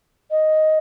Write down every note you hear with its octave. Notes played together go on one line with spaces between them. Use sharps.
D#5